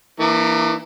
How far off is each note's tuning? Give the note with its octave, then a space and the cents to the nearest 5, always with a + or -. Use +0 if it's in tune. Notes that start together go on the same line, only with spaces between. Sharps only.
E3 +0 A#3 +0 D4 +45